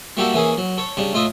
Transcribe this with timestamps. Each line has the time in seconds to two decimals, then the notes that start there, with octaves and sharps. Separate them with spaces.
0.17 G3 A#3 E4 F#4 G4 A4
0.34 E3 A#3 C#4 G#4
0.57 F#3
0.78 A4 C#5
0.97 C#3 G3 D4
1.13 A2 F4 D#5 E5 D#6